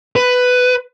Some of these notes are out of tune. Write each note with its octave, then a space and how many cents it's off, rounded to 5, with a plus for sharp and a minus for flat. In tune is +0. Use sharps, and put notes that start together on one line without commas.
B4 +10